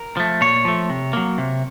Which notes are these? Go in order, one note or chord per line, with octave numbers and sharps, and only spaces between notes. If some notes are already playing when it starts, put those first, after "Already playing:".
Already playing: A#4
F3 A3
A#2 C#5
F3 A3
C3
F#3 A#3
C3